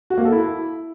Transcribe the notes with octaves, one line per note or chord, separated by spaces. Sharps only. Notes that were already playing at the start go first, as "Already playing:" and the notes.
F#4
A#3
A4
E4